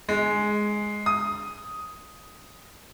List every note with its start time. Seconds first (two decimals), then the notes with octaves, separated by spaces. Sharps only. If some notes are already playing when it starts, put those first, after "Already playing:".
0.09 G#3
1.06 D#6